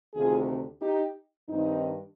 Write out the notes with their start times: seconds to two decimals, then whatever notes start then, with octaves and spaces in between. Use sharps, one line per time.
0.14 D2 C3 D#3 F4 G#4
0.81 D#4 G4
1.48 G2 D#3 C4 D#4